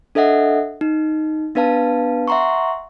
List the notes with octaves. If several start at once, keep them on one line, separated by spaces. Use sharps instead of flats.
D4 A4 D#5 E5 F#5
D#4
B3 D4 B4 F5 A5
E5 F#5 A#5 C6 C#6